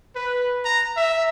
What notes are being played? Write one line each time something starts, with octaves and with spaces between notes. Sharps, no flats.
B4
A#5
E5